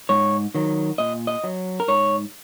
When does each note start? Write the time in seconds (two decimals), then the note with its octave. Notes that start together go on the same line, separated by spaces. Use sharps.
0.09 G#2 C#5
0.55 D#3 F#3
0.98 A#2 D#5
1.27 D#5
1.44 F#3
1.80 A#4
1.88 G#2 C#5